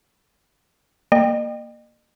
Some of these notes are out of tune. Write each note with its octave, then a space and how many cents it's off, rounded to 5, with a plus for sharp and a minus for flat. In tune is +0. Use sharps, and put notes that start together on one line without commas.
A#3 +0 D#5 -40 G5 +10